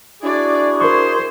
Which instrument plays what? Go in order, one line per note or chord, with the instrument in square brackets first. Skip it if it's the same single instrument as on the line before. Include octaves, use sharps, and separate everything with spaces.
[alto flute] D4 [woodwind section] E4 F#4 G#4 [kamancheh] D5
[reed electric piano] A#4 C#6 [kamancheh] C5